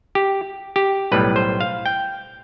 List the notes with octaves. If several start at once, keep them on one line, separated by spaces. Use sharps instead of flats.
G4
G4
B1 A2 G3 B4
C5
F5
G5